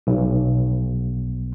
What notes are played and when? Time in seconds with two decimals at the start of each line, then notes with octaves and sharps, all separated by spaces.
0.07 B1